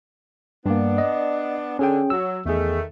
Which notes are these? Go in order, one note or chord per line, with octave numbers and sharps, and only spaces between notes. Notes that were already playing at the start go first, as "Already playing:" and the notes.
G2 A#3 B3 D4
D#5
D3 C#4 G#4 G5
F#3 E6
E2 D#3 A3 G#4